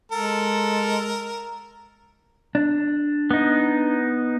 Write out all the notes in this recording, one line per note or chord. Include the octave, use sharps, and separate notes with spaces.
G#3 A4 A#4
D4
B3 D#4